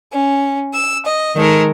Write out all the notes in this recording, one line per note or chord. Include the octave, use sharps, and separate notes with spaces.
C#4
E6
D#5
D#3 G#3 A4 A#4